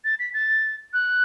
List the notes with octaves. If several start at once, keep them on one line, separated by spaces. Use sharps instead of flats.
A6
B6
A6
F#6